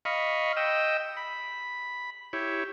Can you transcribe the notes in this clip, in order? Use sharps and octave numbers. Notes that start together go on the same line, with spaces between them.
D#5 F5 B5 C#6
D#5 G5 E6
B5
E4 G4 C#5